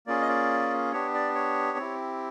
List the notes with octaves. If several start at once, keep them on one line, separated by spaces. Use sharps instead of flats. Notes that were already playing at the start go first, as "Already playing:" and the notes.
A#3 C#4 F4 G#4 D5
D#5
D5
B3 D4 G4 C#5
D5
C#5
C4 E4 G4